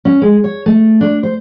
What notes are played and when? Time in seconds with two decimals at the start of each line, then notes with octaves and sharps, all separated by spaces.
0.05 C#4
0.22 G#3
0.44 C#5
0.66 A3
1.01 D4
1.23 C5